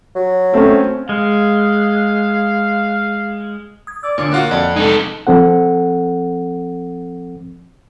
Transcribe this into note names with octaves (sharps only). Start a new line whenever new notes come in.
F#3
A3 C4 C#4
G#3 F5
D#6 G#6
D5 E6
A#2 D3 F3 D4 C#5 D6
A#3 F4 F#4 F#5
F2 D5 D#5 G#5
G#3 D#4 A4
F3 C4 A4 F#5